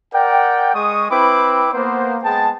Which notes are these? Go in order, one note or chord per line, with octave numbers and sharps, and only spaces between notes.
A#4 D5 F#5 G5
G#3 C#6 D#6
C4 E4 B4 G5 B5 D6
A#3 B3 C5
G#3 B3 G5 A5